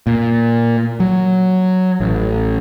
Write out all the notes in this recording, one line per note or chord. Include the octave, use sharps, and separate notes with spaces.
A#2
F#3
A1